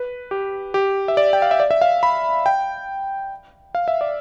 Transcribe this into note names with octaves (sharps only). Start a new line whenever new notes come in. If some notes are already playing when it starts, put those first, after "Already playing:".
Already playing: B4
G4
G4
E5
D5
G5
F5
E5
D5
E5
F5
B5
G5
F5
E5
D5